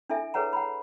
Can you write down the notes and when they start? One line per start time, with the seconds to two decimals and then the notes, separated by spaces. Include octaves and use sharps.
0.09 D4 E4 A4 E5 G#5
0.34 G#4 A4 B4 C#5 F#5 A#5
0.53 F#5 A#5 B5